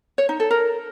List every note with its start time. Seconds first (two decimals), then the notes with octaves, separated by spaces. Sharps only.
0.18 C#5
0.29 D#4
0.40 A4
0.51 A#4